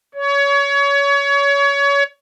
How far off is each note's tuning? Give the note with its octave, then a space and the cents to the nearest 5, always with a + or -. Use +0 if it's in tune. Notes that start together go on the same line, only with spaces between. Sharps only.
C#5 +25